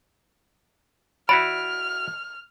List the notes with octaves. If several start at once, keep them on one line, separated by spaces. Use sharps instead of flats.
E4 F#4 D5 B5 F6